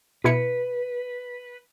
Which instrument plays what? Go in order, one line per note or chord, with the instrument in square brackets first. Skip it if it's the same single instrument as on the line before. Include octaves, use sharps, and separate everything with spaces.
[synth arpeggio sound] B2 E4 C#7 [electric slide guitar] B4